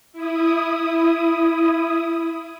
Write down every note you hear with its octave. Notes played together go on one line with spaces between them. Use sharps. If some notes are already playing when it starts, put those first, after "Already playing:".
E4 D#6